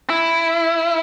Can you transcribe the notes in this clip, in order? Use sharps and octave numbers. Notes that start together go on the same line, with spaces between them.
E4